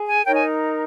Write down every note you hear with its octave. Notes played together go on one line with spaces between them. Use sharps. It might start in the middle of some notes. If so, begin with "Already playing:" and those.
Already playing: G#4
G#5
D#4 A#4 C#5 G5
G#5